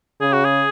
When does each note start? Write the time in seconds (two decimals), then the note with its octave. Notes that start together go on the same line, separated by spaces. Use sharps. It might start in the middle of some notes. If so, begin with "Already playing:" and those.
0.21 C#3 G#4
0.33 F#4
0.45 G#4